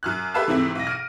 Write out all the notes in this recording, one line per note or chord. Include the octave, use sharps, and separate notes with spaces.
F#2 F6 F#6
G4 A4 B4 E5 F5 A5
G#2 C3 E3 A3 C4 E4
B1 A#6
F6 D7 D#7